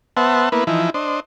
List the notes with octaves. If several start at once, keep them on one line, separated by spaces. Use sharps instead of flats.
B3 C5 E5 F#5 A5
A#3 B3 E4 B4
E3 F3 D#4 E4
D4 C5 D#5